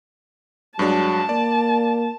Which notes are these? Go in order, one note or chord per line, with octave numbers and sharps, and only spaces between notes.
G2 F#3 G#3 D4 A5
A#3 D5